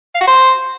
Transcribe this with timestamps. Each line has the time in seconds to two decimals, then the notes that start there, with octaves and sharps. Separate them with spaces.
0.15 F5
0.21 F#4
0.27 C5